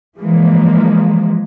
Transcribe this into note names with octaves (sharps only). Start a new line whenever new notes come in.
E3 F3 G#3 A#3